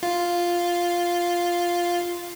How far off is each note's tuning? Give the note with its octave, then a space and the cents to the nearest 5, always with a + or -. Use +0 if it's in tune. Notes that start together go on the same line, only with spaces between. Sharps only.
F4 +0